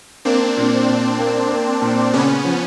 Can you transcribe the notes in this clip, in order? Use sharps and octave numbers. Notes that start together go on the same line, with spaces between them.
A#3 C4 D4
A#2
A#2
A#3
A#3
A#2
C#3 B3 C#4
F3